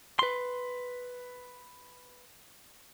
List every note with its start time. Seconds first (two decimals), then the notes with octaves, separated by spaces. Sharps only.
0.19 B4 C6